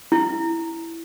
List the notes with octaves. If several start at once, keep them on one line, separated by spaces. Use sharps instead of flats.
E4